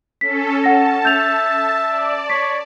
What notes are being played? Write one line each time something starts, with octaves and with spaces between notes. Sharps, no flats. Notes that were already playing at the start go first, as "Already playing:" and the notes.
C#4 A4 B6
F#5 A5 A#6
E5 G6 A6 F7
D5
C#5 B6